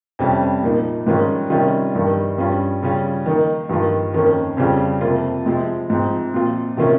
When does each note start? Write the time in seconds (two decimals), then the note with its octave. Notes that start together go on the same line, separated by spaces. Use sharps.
0.19 F2 C3 G3 C#4
0.62 A#2 F3 A#3 D#4
1.06 G#2 D#3 G3 C#4 F4
1.50 C3 D#3 G3 C#4 F4
1.95 G2 D#3 G3
2.38 G2 G3 C#4 F4
2.83 C#3 G3 C#4 F4
3.26 D#3 A#3 D#4
3.69 G2 D#3 A#3 F4
4.14 F2 D#3 A#3 C#4
4.57 F2 C#3 G3 C#4 F4
5.01 F2 C3 F3 A#3 F4
5.46 C3 F3 G#3 C4
5.90 G#2 F3 C4
6.34 A#2 F3 C4 F4
6.77 C3 D#3 A#3 C#4 F4